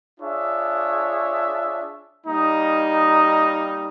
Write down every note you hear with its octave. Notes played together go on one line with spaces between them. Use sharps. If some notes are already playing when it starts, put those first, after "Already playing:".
D4 F4 G#4 C#5 E5
G3 A#3 D#4